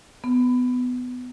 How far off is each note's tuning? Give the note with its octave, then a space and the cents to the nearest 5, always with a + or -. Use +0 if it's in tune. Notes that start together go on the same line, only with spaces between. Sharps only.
B3 +15